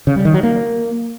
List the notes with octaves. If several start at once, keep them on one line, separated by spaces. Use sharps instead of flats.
C#3
G3
D#3
F#3
A#3